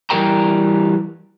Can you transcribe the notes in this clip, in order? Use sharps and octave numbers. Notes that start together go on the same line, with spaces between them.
E3 G3 A#4 G5 A#5